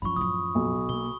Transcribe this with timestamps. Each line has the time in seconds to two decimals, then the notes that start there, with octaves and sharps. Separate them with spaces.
0.02 F#2 F3 C#4 E4 B5 C#6
0.16 A2 F#3 D#6
0.55 B1
0.89 B2 A#3 G7